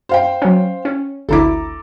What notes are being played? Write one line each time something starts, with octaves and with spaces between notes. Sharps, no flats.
C5 F5 G5
F#3 C#4
C#4
G#1 D2 E4 A4 A#5 D6